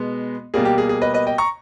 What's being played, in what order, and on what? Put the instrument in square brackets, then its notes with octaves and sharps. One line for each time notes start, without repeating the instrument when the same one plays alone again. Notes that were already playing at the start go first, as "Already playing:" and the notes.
Already playing: [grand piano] B2 G#3 B3
B2 G3 A#3 G#4
G4
G#4
G#4
B4 D#5
B4 D#5
D#5 G5
A#5 C#6